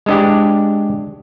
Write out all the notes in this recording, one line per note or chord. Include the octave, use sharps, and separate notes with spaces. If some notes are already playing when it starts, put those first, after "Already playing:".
G#3 D4 G4